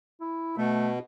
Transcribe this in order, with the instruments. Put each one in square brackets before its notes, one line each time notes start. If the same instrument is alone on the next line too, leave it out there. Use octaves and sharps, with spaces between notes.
[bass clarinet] E4
[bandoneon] B2 [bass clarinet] A3